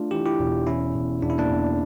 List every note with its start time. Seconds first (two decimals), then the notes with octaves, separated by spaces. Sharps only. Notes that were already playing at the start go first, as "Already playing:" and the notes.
Already playing: A3 D4 F4
0.11 E3 G4
0.26 E4 G4
0.39 E1
0.67 E3 C#4 E4
0.94 E1
1.22 E1 D4
1.30 E4
1.38 A#3 D4
1.51 E2